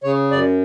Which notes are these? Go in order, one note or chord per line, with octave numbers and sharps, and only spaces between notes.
C#3 C#5
F#2 D5